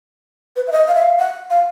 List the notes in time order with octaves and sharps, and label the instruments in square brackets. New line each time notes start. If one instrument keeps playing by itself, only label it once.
[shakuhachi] B4
E5
D#5
F5
E5
F5
F#5
F5